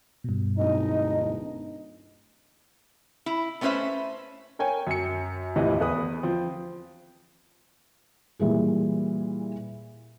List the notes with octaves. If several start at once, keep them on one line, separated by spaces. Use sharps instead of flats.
G2 B2
D1 D#4 D#5
E4
A3 B3 C#4 B4 C5 E5
A#4 C#5 G5 G#5
F#2 C#7
D#1 A2 C3 E3 D#5
E2 B4 D#6
F3 C4
A#2 E3 G3 G#4